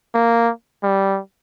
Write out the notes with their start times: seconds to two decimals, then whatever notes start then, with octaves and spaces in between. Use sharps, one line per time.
0.15 A#3
0.83 G3